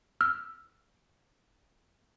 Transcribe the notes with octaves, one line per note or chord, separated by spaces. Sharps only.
E6 F6